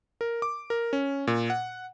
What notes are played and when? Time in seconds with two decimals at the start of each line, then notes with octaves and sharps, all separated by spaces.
0.21 A#4
0.42 D6
0.70 A#4
0.93 C#4
1.27 A#2
1.50 F#5